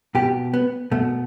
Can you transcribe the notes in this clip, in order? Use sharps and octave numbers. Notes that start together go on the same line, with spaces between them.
B2 G4
B3
B2 A3